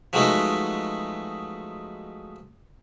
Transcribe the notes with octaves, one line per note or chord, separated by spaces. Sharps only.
F3 F#3 G#3 A3 B3 D#4